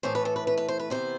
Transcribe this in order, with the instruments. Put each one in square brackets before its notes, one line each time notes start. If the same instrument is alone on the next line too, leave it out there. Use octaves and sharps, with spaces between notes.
[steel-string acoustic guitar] A2 E3 A3 C5
B4
A4
B4
B4
B4
C5
B4
C3 E3 B3 C5